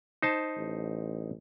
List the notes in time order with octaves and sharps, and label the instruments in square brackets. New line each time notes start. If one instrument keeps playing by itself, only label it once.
[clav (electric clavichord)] D#4 C5 A5
[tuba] A1